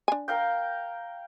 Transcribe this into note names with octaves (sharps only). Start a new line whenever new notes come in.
D4 G#5
A#4 F5 G5